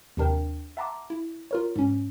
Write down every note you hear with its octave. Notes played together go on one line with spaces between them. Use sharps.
D#2 C3 D4 A#4 G5
E5 F#5 A5 A#5 C6 D6
E4
F4 A#4 C#5
G#2 C#4